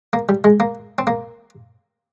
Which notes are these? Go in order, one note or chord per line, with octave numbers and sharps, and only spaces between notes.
A#3
G3
G#3
A#3
C4
A#3